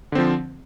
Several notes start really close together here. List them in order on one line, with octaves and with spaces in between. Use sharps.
D3 C4 F3